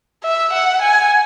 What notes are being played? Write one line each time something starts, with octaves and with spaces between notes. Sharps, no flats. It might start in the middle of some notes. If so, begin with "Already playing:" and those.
E5
F#5
G#5